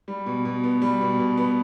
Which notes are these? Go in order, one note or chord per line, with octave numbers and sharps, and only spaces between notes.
G3
B2
B2
B3
G3
B2
B2
B3